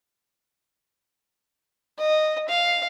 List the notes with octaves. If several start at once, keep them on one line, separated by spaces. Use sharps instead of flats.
D#5
F5